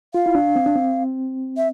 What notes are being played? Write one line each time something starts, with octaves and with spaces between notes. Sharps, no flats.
F4 F5
E4
D4
C4
D4
C4
E5